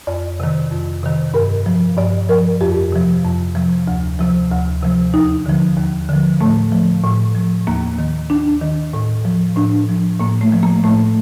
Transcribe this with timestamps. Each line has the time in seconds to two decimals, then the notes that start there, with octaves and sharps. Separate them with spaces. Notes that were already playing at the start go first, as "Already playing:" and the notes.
0.07 F2 D5
0.40 C3 D#3
0.71 F2
1.03 C3 D#3
1.34 G2 A#4
1.66 F3
1.97 G2 D5
2.29 F3 A#4
2.61 F2 G4
2.92 C3 F3
3.24 F2
3.55 C3 F3
3.87 D2
4.19 C3 F3
4.51 D2
4.82 C3 F3
5.14 D#2 D#4
5.46 D3 F3
5.77 D#2
6.09 D3 F3
6.41 A2 A3
6.72 F3
7.04 A2
7.35 F3
7.67 D#2 A#3
7.99 D#3
8.30 D#2 D4
8.62 D#3
8.93 A2
9.25 F3
9.56 A2 D4
9.89 F3
10.19 A2 A#3
10.41 A3
10.52 F3
10.63 A#3
10.84 A2 A3